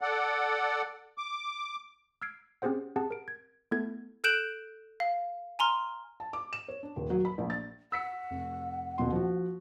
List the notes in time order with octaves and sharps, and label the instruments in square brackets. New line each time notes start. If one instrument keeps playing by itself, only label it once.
[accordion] A4 D5 F#5
D6
[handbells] E6 F6 G#6 C7 D7
C4 C#4 G4 G#4 C5 F#5
C4 G4 G#4 F#5 A5
A#4 D7
G#6
A3 B3 E4 A4 G#6
[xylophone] A4 F#6 G6 D7 E7 F#7
F5
G#5 A#5 C6 F6
[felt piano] A5
D6
E7
C#5
D4
D#1
F#3
B5
A#1
A6
[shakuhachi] F#5 [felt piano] E6 B6 C#7
[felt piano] F1
D#1 B2 C6
F3 F#4